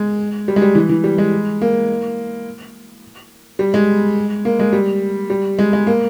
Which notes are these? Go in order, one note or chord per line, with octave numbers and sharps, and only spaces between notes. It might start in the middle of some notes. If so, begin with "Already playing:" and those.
Already playing: G#3
G3
G#3
G3
E3
E3
G3
G#3
A#3
G3
G#3
A#3
G#3
G3
G3
G#3
G#3
A#3